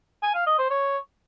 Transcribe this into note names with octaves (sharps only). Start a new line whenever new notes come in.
G#5
F5
D#5
C5
C#5